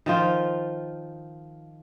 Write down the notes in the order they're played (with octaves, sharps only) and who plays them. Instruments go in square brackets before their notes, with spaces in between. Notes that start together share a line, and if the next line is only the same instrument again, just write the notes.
[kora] D#3 F3 F4